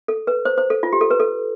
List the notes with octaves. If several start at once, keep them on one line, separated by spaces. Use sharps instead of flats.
A4
B4
C5
C5
A4
F4
G4
A4
B4
A4